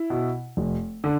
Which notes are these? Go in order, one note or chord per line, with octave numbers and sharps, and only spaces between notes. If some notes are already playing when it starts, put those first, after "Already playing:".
Already playing: E4
B2
F1
D3